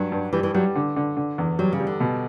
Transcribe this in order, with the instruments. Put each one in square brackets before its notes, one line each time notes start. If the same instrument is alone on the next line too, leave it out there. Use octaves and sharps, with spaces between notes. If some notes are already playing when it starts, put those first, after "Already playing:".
Already playing: [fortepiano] G2 [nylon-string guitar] F#3
[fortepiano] G2
[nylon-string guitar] E3 [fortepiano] G3
[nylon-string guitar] E3
[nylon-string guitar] F#3 [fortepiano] G3
[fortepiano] D3
D3
D3
E2
[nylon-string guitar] F#3 [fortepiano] G3
[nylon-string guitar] C#3
[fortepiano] G3
[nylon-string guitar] D3
[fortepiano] B2